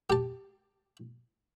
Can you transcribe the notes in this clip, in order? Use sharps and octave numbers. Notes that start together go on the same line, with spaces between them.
G4 A5